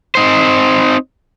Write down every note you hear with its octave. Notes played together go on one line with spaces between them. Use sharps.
C4 D#4 C5